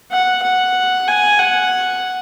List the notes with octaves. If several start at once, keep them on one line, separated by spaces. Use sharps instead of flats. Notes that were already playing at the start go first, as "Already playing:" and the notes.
F#5
F#5
G#5
F#5